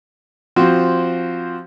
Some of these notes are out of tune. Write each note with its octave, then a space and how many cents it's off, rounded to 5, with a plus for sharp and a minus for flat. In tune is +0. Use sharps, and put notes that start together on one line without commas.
F3 +0 C4 +0 F#4 +10